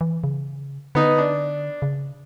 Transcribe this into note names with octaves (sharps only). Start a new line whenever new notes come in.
E3
C#3
D3 B3 D#4
D4
C#3